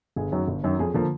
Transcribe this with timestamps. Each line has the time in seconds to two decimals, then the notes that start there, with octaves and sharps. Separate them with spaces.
0.16 G1 G#4
0.32 F#2 D#3 F#3
0.48 G1
0.63 F#2 D#3 F#3
0.79 F2 G#4
0.94 D3 F3 A#3